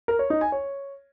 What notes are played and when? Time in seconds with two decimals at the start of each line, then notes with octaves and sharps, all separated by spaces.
0.08 A#4
0.19 C#5
0.30 D#4
0.41 G#5
0.52 C#5